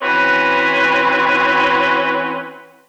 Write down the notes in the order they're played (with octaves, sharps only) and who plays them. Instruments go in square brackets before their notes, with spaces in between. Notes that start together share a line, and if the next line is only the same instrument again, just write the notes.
[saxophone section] E3 C4 C#4 F#4 B4